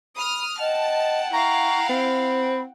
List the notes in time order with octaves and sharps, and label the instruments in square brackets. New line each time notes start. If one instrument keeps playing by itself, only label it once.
[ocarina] B5 [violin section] D#6 F6
[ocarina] D#5 [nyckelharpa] F#5 G5 [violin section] A5
[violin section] E4 F5 [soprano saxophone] A#5 [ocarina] C#6
[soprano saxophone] C4 [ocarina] B5